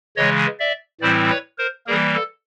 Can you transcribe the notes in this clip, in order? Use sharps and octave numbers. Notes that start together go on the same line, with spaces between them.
C#3 E3 G#3 C#5 D#5
D5 E5
A2 E3 G3 C4 E4 C5 D5
B4 C#5
A#4 C5
E3 G3 A#3 G#4 A#4
A4